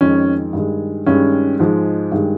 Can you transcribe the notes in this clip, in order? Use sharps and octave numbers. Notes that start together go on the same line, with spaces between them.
F2 D#3 G#3 C#4
G2 D#3 G#3
G2 D#3 G#3 C#4
G#2 F3 G#3
G2 D#3 G#3